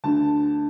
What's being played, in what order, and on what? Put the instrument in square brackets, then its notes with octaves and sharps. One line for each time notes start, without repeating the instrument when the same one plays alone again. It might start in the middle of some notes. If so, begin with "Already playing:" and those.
[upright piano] D2 D3 A5